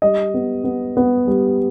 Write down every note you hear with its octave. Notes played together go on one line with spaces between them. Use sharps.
G3 D#5
B3
B3
B3
G3